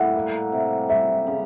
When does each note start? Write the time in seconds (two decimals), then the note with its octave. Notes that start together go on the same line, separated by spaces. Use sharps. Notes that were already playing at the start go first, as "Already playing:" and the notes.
Already playing: A2 G3 F#5
0.15 A#3
0.52 C3
0.89 G3 E5
1.27 C#3